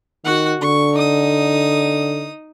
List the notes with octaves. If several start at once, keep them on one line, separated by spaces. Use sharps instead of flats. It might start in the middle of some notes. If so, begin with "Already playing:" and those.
D#3 F#4 F#5
D3 C#6
D#4 D#6